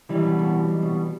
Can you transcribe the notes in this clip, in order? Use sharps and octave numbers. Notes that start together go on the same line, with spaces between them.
B1 E3 G3
B2
B2
B1
B1
B2